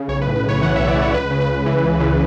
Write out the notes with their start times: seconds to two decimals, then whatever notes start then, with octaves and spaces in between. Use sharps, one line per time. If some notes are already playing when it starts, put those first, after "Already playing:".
Already playing: C#3
0.08 B1 C#5
0.21 B4
0.27 A2
0.36 B4
0.43 B1
0.49 C#5
0.62 E3 F#5
0.76 B1 E5
0.88 D5
0.97 A2 C#5
1.14 C#2 B4
1.31 C#3
1.40 B4
1.49 C#2
1.66 E3
1.83 C#2
2.00 C#3